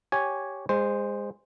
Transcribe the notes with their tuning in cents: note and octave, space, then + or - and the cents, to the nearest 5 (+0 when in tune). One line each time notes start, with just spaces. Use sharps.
G4 -10 C#5 +0 G#5 +0
G#3 -25 C5 +0